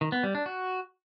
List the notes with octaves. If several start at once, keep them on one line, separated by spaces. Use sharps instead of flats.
D#3
B3
G3
D4
F#4